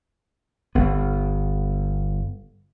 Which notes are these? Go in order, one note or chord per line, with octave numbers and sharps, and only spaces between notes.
G1 B3